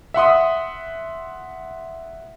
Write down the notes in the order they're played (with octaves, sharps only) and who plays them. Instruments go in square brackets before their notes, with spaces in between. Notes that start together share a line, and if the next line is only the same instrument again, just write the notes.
[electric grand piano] E5 F#5 C6 D#6